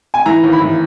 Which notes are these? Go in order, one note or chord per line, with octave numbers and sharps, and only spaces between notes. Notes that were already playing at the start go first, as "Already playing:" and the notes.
G#5
E3 A#5
D#2
B5
E3